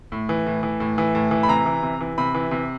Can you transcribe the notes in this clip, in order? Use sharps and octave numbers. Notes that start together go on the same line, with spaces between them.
A2
E3
A2
E3
A2
E3
A2
E3
B5
C3 A#5
E3
C3
E3
C3 B5
E3
C3